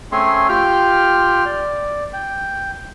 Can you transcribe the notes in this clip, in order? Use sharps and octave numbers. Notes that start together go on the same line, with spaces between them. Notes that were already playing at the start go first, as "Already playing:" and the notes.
A3 C4 C#4 G#4 C#5 C6
F4 G4 G5 F6
D5
G5